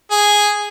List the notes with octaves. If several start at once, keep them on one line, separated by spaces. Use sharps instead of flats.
G#4